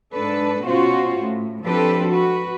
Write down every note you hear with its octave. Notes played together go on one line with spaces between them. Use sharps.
G#2 D4 A4 B4
B2 C#4 F4 F#4 C5
A2
F3 C4 D4 G4 A4 B4
F#4 B4